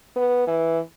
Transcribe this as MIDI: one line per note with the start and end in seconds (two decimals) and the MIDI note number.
0.16 0.43 59
0.47 0.79 52